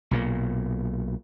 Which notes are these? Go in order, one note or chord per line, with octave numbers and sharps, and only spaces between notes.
B1 A#2 A#3